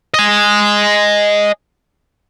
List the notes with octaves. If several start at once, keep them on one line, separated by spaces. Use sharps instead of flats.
D#5 G#5